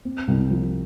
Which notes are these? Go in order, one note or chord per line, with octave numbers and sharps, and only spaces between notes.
C4
C2
F3